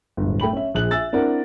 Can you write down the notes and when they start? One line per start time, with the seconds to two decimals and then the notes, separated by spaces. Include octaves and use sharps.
0.17 D1 G1
0.40 A3 G5 B5 F#7
0.53 C#4 E5
0.74 A#1 G#4 F#6 F#7
0.91 E5 G#5 E6 A6
1.13 C4 D4 E4 A#4 F#5